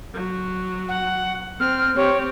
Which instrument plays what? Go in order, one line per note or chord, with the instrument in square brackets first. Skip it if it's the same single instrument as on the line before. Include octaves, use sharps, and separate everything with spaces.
[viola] F#3
[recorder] F#5
[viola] C4 [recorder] F6
[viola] C4 G4 [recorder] C#5